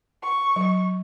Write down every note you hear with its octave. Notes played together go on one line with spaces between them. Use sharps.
C#6
F#3